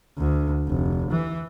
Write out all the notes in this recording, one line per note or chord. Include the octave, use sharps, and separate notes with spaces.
D2
F1
E3